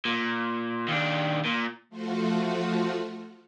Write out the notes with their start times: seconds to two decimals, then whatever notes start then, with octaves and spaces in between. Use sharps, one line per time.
0.05 A#2
0.88 D#2 D4
1.45 A#2
1.89 F3 A3 F4 F#4